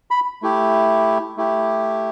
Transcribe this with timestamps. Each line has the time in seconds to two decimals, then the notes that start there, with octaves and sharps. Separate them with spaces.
0.11 B5
0.42 A3 E4 G4
1.37 A3 E4 G4